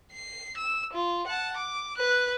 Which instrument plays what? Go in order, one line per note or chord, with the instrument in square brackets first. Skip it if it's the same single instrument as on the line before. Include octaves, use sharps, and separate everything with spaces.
[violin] C7
E6
F4
F#5 A5
D6
B4 F#6